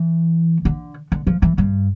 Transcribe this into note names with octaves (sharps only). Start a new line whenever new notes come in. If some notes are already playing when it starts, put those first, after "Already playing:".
Already playing: E3
D3
D3
F3
E3
G2